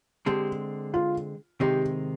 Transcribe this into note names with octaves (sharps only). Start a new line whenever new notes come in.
D3 G#3 C4 G4
F4
C3 D#3 G#3 C4 D#4 G4